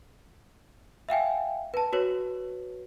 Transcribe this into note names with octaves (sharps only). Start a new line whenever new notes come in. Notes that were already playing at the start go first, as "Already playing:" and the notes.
E5 F5 G5 G#5
B4 A5
F#4 B4 C#5